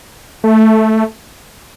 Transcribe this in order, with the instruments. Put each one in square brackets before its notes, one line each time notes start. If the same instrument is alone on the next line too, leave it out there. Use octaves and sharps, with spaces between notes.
[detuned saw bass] A3